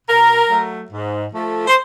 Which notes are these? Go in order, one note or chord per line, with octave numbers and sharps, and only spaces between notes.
B2 A#4
F#3 A3
G#2
F3 A3
C5